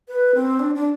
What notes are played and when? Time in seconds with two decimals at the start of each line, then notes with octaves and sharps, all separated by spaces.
0.08 B4
0.35 C4
0.59 D4
0.75 D4